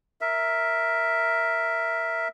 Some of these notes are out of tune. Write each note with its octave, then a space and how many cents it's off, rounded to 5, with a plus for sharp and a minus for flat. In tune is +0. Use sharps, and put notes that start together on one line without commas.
A#4 +0 E5 +0